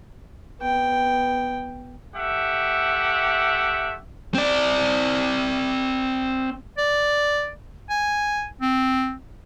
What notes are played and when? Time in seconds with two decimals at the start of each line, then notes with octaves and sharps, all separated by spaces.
0.61 B3 G5
2.15 A3 G4 E5 F#5
4.34 C4 D5
6.78 D5
7.90 G#5
8.61 C4